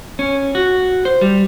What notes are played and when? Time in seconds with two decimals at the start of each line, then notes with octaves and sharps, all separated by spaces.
0.19 C#4
0.55 F#4
1.05 C5
1.21 G3